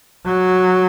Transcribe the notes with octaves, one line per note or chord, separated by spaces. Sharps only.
F#3